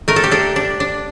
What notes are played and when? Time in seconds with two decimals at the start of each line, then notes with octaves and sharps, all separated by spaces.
0.08 A3 A#4
0.16 A4
0.24 G4
0.31 D4 A4
0.56 D4
0.80 D4